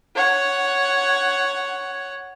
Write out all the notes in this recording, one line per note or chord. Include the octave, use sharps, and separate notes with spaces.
C#5 F#5